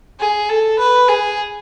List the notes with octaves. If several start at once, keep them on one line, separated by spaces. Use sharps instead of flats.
G#4
A4
B4
G#4